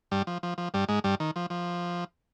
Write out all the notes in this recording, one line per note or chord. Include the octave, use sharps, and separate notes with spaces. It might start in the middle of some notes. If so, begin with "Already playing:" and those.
G2 G3
F3
F3
F3
G2 G3
G#2 G#3
G2 G3
D#3
F3
F3